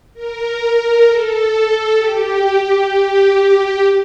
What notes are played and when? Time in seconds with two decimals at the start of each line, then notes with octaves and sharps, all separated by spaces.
0.14 A#4
1.05 A4
1.96 G4
2.87 G4